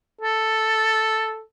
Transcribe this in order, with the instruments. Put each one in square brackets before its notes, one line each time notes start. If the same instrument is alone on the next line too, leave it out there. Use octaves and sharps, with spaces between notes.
[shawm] A4